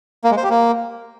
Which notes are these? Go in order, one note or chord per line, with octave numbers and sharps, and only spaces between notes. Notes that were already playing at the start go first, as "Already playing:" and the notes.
A#3
G#3
C5
G4
A#3